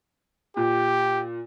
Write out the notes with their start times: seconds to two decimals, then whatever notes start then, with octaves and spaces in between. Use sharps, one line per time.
0.57 A#2 G4